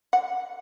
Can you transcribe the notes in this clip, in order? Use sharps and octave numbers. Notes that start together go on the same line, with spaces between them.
F#5